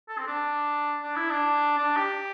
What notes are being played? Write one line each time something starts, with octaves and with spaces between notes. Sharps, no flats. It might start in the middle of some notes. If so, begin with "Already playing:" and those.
A4
C4
D4
D4
E4
D4
D4
G4